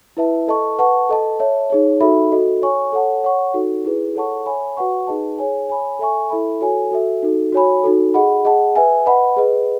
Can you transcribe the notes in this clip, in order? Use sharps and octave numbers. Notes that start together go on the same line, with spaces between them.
E4 B4 E5 A5
A4 D#5 A5 C#6
B4 F#5 A5 C#6
A4 D#5 A5
C#5 E5 A5
D#4 G#4 C#5
D#4 F#4 A4 E5 B5
F#4 A4 D#5
C#5 G#5 C#6
A4 C#5 F#5 A5
C#5 F#5 C#6
D#4 F#4 A4
E4 G#4 B4
A4 C#5 F#5 A5 C#6
C#5 E5 G#5 B5
F#4 B4 F#5 C#6
D#4 G#4 B4 D#5 A5
G#4 C#5 G#5
C#5 G#5 B5
A4 E5 G#5 C#6
E4 A4 E5 B5
F#4 A4 C#5 G#5
F#4 A4 E5
D#4 F#4 A4
F#4 C#5 G#5 B5
D#4 F#4 A4
G#4 D#5 F#5 B5
G#4 D#5 F#5 A5
B4 E5 G#5
B4 D#5 F#5 B5
G#4 B4 D#5